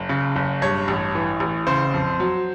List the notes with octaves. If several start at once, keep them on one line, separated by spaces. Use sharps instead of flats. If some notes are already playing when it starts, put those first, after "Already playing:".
Already playing: F#1
C#3
F#1
G2 C#5
A1
E3
A1
C#3 C5
F2
F#3